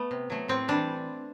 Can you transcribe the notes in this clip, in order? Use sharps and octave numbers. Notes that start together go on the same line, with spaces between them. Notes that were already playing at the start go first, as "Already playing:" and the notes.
Already playing: A3 B3
C3
F#3 A3
A2 C4
E3 G3 D4